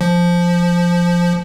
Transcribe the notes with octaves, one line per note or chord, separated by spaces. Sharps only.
F3